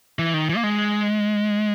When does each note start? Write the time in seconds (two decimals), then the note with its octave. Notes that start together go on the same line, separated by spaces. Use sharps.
0.19 E3
0.34 D#3
0.49 E3
0.56 A#3
0.63 G#3